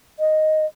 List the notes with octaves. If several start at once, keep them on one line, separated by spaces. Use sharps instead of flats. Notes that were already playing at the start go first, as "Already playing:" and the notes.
D#5